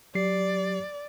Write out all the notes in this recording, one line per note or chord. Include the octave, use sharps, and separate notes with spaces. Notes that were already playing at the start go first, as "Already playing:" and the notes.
F#3 G4 D5 C7